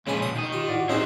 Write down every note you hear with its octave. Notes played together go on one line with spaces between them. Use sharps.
A#2 C#3 F3 G#3 B4 G#5
B2 D#6
D#3 D#5
F4 G4
A2 F#4 D5
C4 C#4 D#4 E4 F#4 G#4 C5 D#5